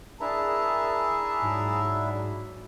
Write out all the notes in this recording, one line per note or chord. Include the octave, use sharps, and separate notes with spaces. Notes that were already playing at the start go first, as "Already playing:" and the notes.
D4 E4 G#4 A#4 E5 A5 A#5
G#2 F#3